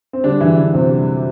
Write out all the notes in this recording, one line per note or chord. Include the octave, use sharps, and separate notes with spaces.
C4
D3 G3 D4
F#2 E3 E4
D3 E3 D4
F#2 C3 C4
G3